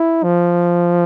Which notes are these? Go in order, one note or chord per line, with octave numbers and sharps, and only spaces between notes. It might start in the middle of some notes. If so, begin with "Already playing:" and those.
Already playing: E4
F3